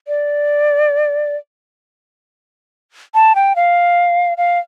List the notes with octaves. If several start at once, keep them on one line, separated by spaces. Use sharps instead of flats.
D5
A5
G5
F5
F5